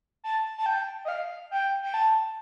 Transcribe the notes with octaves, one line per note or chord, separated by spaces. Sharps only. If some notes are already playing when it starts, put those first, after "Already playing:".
A5
A5
G5
D#5
F5
G5
G5
A5